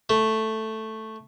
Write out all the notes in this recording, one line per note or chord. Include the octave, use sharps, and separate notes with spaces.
A3